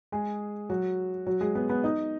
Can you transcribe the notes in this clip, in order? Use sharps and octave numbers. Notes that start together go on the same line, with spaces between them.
G#3 G#4
F#3 F#4
F#3 F#4
G#3 G#4
B3 B4
B3 B4
D#4 D#5